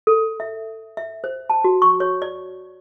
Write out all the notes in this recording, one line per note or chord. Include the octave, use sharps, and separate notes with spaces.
A4
E5
E5
C5
A5
F#4
C#6
C#5
D5